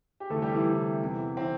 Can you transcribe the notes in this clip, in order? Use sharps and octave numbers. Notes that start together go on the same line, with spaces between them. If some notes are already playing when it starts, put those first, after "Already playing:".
G4
D2 C3 E3 A3 A4
G3 G4
E3 E4
D2 C3 E3
E2 C3 E3
C3 E3 C4